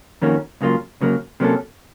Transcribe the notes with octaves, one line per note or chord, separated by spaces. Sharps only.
F2 D#3 A#3 C#4 F#4
C#2 C#3 F#3 A#3 F4
C#2 C#3 F#3 A#3
C3 F#3 A#3 C#4 A4